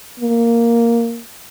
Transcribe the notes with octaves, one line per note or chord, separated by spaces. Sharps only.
A#3